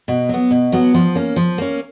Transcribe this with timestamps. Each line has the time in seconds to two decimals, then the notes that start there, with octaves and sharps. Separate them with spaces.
0.08 B2
0.29 F#3 B3
0.51 B2
0.72 F#3 B3
0.94 F3
1.15 A#3 C#4
1.36 F3
1.58 A#3 C#4